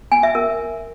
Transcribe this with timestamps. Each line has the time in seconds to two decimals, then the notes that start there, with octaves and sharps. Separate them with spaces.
0.12 G#5
0.23 E5
0.35 A#4